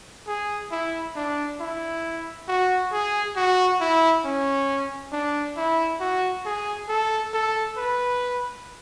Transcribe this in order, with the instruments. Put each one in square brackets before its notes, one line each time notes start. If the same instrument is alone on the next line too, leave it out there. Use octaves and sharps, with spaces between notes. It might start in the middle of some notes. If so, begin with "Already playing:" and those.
[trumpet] G#4
E4
D4
E4
F#4
G#4
F#4
E4
C#4
D4
E4
F#4
G#4
A4
A4
B4